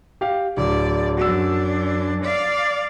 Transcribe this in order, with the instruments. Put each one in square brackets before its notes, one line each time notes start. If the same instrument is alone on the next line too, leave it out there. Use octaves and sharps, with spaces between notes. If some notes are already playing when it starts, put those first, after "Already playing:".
[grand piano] G4 F5
[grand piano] D1 [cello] D5
[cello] F#2 D4 [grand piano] F#4 E6
[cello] D5 F5